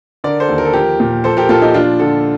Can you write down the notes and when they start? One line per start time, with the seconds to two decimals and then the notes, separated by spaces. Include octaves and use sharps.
0.24 D3 A#4 D5
0.40 A4 C5
0.49 D#2
0.58 A#4
0.65 A4
0.73 F3 G4 A#4
1.00 A#2
1.24 F3 A4 C5
1.37 G4 A#4
1.49 A#2 F4 A4
1.62 D#4 G4
1.74 F3 D4 F4
1.99 D3 F4 A4